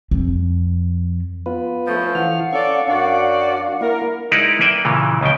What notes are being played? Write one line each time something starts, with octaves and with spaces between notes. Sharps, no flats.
F2
B3 F4 B4
F3 A3 C#4
E3 F5 F#5 F6
C#4 A4 D5 C#6
F#2 D4 F#4 D5
A#3 E4 A#4
G#3 D#4 E4 A#4 B4 D5
A#3 B4 D5 E5 G5
A#2 C#3 E3
C#2 C#3 F3 G5